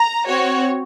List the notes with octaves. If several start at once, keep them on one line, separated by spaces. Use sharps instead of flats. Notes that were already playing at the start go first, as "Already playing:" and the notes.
Already playing: A#5
C4 F#4 C#5